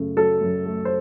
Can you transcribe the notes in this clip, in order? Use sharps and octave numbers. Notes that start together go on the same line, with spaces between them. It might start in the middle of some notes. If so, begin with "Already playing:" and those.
Already playing: F#2 C#3 A3
F#3 A4
F#2
A3
C5